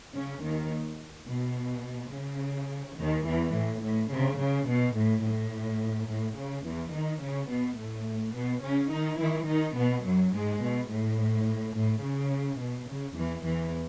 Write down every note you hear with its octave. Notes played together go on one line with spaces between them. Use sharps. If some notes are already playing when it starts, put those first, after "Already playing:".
C#3 C#4
D#2 D#3
B2
C#3
D#2 D#3
E2 E3
A2
A2
C#3
C#3
B2
A2
A2
A2
C#3
E2 E3
D#3 D#4
C#3 C#4
B2 B3
A2 A3
B2 B3
C#3 C#4
D#3 D#4
E3 E4
D#3 D#4
B2 B3
F#2 F#3
G#2 G#3
B2
A2
A2
C#3
B2
C#3
E2 E3
E2 E3